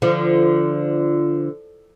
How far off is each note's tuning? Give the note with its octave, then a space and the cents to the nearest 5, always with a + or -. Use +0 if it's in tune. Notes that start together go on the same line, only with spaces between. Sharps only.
D3 +0 F3 -20